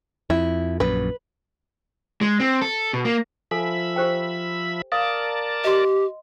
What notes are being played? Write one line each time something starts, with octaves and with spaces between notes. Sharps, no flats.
F2 E4
A#1 F#2 B4
G#3
C4
A4
B2
A#3
F3 A4 E5 G#5 B5
G4 C5 G5
A#4 D5 F5 A5 D#6
G4 D#5 C6